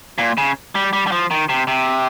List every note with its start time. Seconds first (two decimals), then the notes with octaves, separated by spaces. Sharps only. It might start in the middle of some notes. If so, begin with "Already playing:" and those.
0.18 A#2
0.38 C#3
0.75 G3
0.93 G3
1.07 G3
1.12 F3
1.31 D#3
1.49 C3
1.67 C3